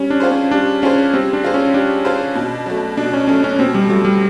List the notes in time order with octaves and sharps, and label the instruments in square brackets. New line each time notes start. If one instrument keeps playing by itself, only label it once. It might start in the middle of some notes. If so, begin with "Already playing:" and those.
Already playing: [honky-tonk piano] G3 [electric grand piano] C#4
[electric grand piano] D4
[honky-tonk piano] C4 F4 G#4 C5
[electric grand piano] C#4
[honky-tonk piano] G3 [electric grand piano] D4
[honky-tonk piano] C4 F4 G#4 C5 [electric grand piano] C#4
[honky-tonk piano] G3 [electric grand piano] C4
[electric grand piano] D4
[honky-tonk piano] C4 F4 G#4 C5
[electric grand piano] C#4
[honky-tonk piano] G3 [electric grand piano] D4
[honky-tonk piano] C4 F4 G#4 C5
B2
F#3 A3
[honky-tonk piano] B2 [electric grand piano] D4
[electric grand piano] C#4
[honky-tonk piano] F#3 A3 [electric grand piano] C#4
[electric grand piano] C#4
[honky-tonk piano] B2 [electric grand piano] C4
[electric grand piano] G3
[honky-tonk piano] F#3 A3 [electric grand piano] G3
[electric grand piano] G3